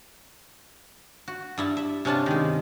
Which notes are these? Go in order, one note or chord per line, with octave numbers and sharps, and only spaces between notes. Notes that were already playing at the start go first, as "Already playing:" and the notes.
F#4
G2 E4 A5
E5
C3 C#4 D4 F4 A5
D#3 G#3